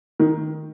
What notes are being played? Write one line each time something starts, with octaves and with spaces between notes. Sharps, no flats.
D#3